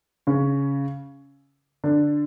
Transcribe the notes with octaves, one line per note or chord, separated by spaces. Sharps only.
C#3 C#4
D3 D4